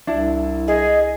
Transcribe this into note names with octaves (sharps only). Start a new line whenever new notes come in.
C2 D4 E4
G#4 D#5